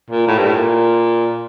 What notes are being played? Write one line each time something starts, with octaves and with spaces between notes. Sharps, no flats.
A#2
A2
G2
A2
A#2